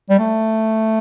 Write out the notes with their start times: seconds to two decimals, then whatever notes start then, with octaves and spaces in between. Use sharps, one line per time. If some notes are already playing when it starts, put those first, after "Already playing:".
0.10 G3
0.19 A3